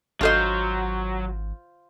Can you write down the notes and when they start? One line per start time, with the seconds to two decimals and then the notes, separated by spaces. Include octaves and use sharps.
0.21 G#1 F#3 D4 F4 A4 C5 D#5 C6